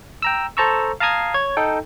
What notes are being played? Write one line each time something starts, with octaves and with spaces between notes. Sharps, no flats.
G5 A#5 E6
A4 C5 A5 A#5 C#6 E6
F5 A5 A#5 D#6 G#6 C7
C#5 G#6
D#4 A4 G5